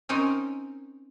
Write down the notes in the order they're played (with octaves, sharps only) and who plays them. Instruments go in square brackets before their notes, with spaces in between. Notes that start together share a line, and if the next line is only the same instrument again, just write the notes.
[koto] C4 C#4 D#4 A#4